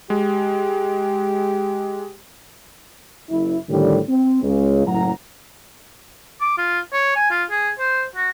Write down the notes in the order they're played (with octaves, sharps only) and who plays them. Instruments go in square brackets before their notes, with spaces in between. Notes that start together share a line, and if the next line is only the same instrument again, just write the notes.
[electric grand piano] G#3 [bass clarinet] G4
[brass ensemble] F#1 E4
A2 D3 D#3 F3 G3
C4
C#2 C#3
F#1 A2 F#3 F#5 A#5
[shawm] D6
F4
C#5
G#5
F4
G#4
C5
F#4